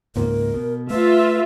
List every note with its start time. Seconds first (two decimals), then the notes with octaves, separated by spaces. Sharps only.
0.16 C#2 G#2 A#3 A#4
0.54 B2
0.90 A3 F4 B4 E5